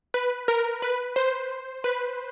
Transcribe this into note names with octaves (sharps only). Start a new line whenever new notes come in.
B4
A#4
B4
C5
B4